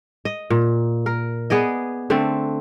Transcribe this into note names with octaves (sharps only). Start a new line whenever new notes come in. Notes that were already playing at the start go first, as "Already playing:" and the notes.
D#5
A#2
A#4
B3 G#4 D5 D#5
D3 A3 C4